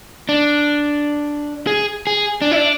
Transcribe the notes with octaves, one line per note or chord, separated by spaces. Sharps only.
D4
G#4
G#4
D4
E4
D4